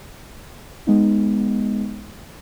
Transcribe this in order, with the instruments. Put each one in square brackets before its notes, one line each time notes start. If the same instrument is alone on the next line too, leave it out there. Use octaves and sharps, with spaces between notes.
[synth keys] G#3 B3 D#4